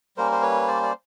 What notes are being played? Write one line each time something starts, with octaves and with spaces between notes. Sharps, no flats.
G3 A#3 C#4 A#4 C5
C5
B4 C#5
C5 D5
D5